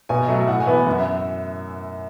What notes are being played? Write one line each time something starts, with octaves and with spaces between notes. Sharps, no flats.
B2 G#5
D#5
F#3 A3
E5
A2 F#5
G#5
E3 B3 E4
G#5
F#2 F#5
E5